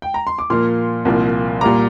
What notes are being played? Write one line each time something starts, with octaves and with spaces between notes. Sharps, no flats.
G5
A#5
C6
D6
A#2 F3 A#3 C6 F6
C2 A#2 F3 A#3
A#2 G3 A#3 A#5 D6